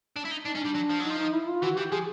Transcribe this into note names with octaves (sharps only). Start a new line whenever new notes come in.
D4
E4
D#4
D4 D#4
C#4
D4
G3
F#3
F3
F#3
D#4
F3
D#4
E4
F4
E3 F#4
E3 G4
F3 G#4